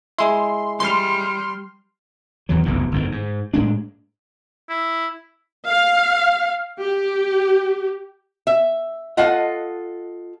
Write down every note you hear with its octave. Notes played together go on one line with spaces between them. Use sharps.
G#3 E4 C6
G3 C6 F6
E2 E3 F#3
F1 B1 E2 C3
G1 F2 D#3
G#2
A2 G#3 D4
E4
F5
G4
E5
F4 A4 D#5 F#5